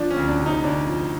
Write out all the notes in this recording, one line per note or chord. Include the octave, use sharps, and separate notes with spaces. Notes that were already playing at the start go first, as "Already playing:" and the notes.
Already playing: F3 D4
C#4
D2
D4
C3
D#4
D2 D4
F3